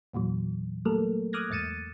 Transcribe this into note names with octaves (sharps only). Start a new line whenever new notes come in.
E2 A#2 E3 F#3
F#3 G3 A3 A#3 A4 A#4
D6 D#6 F6 F#6 G#6 A#6
E2 G#2 A6 C#7 D#7 E7